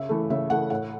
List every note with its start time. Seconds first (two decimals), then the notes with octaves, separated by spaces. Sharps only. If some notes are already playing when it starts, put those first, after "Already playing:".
Already playing: C#3 E5
0.09 E3 A3
0.30 C#3 E5
0.50 E3 A3 F#5
0.70 A2 F#5